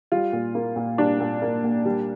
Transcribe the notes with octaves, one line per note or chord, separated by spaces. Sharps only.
G3 F4
A#2
A#3
A#2
G3 D4
A#2
A#3
A#2
G3